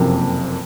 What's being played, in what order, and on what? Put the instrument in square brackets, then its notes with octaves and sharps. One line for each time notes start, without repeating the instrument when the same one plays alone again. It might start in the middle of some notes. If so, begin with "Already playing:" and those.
Already playing: [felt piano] F#1 F2 C3 F3 A#3